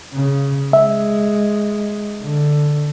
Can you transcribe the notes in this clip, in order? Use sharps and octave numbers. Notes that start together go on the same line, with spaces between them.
C#3
G#3 E5
D3